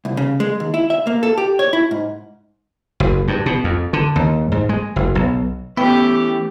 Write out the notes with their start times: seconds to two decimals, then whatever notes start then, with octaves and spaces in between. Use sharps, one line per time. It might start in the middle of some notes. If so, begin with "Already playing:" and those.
0.05 C2
0.17 C#3
0.40 G#3
0.60 D#2
0.74 E4
0.90 E5
1.07 A#3
1.23 A4
1.37 G4
1.59 C#5
1.73 E4
1.91 G#2
3.00 F#1
3.28 G2
3.46 B2
3.64 F2
3.93 D3
4.16 D#2
4.52 G#2
4.69 G#3
4.96 F#1
5.15 B1
5.77 E3 A3 B3 C#4 E4 G4 G5